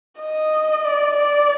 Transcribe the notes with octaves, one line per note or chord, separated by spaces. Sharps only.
D#5
D5
D5